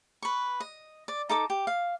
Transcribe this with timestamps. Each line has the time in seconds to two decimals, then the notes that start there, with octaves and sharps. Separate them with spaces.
0.22 B4 C#6
0.60 D#5
1.08 D5
1.29 D#4 A4 D6
1.50 G4
1.67 F5